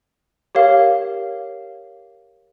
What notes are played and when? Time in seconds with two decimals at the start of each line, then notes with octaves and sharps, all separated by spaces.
0.55 G4 A#4 C#5 F5